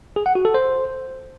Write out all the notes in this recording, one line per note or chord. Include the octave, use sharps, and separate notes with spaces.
G#4
F#5
F#4
A4
C5